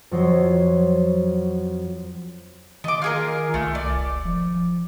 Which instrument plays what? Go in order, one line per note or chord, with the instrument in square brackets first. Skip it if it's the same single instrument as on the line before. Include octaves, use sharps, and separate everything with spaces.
[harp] F2 F#3 C5
[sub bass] D#3 [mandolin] D#5 D6
[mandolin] F4 G#4 A#4
[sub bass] C2 [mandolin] A3
[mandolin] D5
[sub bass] E1
F3